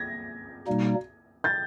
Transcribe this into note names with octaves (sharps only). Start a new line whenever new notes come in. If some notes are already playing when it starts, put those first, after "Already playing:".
Already playing: G#6 A#6
B2 G3 A#3 D#4
G6 A6